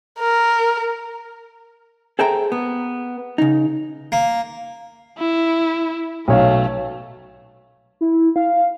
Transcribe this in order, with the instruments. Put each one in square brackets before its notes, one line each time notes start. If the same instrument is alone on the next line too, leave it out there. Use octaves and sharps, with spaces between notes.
[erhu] A#4
[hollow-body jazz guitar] G#4 A4 C5 E5 G5 A#5
B3
C#3 D#4
[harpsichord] A#3
[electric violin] E4
[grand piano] B1 C#5 F5 [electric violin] A3
[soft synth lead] E4
F5